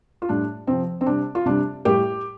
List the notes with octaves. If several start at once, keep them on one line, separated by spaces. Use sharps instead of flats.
F4
A2 G3 D4
C3 F3 C4
C4
C3 G3 D4
F4
C3 G3 D4
A2 G3 G4